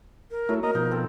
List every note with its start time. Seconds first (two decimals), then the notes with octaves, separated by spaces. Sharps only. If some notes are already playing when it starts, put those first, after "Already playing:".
0.31 A#4
0.49 F#3 A3 E4
0.63 A#3 A#4 D#5 A#5
0.75 B2 F3 D#4
0.91 C4 A4 G5